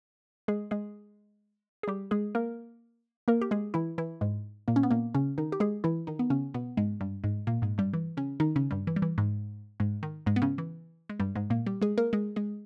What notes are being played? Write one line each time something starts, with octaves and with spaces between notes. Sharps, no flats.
G#3 G#4
G#3 G#4
G#4
G3 G4
G#3 G#4
A#3 A#4
A#3 A#4
G4
G#3 G#4
E3 E4
E3 E4
G#2 G#3
A#2 A#3
C#4
B3
A#2 A#3
C#3 C#4
D#3 D#4
G4
G#3 G#4
E3 E4
D#3 D#4
B3
C#3 C#4
B2 B3
G#2 G#3
G2 G3
G#2 G#3
A#2 A#3
G#2 G#3
G2 G3
E3
C#3 C#4
D#3 D#4
C#3 C#4
G2 G3
E3
G3
E3
G#2 G#3
G#2 G#3
D#3
G#2 G#3
B3
C#3 C#4
E3
G#3
G2 G3
G#2 G#3
A#2 A#3
G3 G4
G#3 G#4
A#3 A#4
G#3 G#4
G#3 G#4